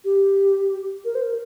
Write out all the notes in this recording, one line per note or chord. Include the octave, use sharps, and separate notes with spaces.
G4
A#4
C5
A#4